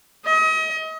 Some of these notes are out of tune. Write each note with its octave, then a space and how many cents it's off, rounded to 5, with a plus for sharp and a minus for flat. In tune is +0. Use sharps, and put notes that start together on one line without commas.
D#5 +35